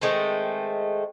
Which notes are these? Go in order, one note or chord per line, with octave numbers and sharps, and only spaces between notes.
D#3 G#3 A3 C4